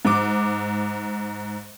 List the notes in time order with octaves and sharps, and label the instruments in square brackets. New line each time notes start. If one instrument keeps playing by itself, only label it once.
[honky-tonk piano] G#2 D6